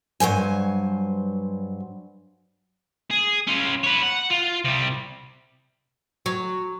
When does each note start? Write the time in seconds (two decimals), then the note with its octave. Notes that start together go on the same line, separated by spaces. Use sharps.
0.20 G2 F#3 C5 G#5
3.11 G#4
3.47 C#4 F4
3.83 B4 C#5
4.03 F#5
4.30 F4
4.65 C3 G3
6.26 F#3